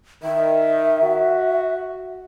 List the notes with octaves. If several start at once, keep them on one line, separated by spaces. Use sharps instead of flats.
D#3 E5
F#4